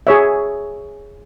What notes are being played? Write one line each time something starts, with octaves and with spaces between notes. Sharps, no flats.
G#4 C#5 E5